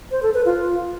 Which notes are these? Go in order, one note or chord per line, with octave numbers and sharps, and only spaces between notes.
C5
A4
B4
F4